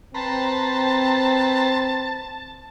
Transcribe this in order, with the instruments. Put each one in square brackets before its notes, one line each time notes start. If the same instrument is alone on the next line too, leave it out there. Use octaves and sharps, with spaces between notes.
[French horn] C4 [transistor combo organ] B4 C5 A#5 [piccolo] A5